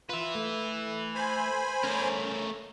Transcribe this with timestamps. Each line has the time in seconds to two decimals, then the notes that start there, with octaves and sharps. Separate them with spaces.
0.09 F4 B4 E5
0.35 A3
1.15 C5 G#5 B5
1.84 A3 C#4 A#4